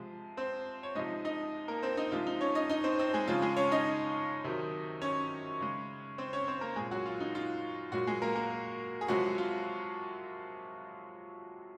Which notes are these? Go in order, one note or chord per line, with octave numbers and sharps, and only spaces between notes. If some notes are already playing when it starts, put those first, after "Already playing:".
Already playing: C3 F3 G#3
C4 C5
C#5
C3 F3 G#3 D#4 D#5
D#4 D#5
A#3 A#4
C4 C5
D#4 D#5
C3 F3 G#3 F4
D#4
C#4 C#5
D#4 D#5
D#4 D#5
C4 C5
C4 C5
G#3 G#4
C#3 F3 G#3 F4
G#3 G#4
C#4 C#5
D#4 D#5
C3 D#3 F#3
C#4 C#5
C#3 G#3
C4 C5
C#4 C#5
C4 C5
A#3 A#4
A#2 G#3 G#4
F#3 F#4
F4
D#4
F4
A#2 F#3 G#3 F#4
G#3 G#4
A#3 A#4
A#3 A#4
G#4
C3 F3 F#3 G#3 F#4
F4